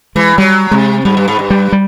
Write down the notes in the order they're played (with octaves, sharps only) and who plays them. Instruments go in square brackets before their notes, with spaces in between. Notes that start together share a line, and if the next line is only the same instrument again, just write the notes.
[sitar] E3 [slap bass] G#3
[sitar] F#3 [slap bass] G3
[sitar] C3 [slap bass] G#3
[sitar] G#2 [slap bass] G3
[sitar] G2
G#2
G2
[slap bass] G3
G3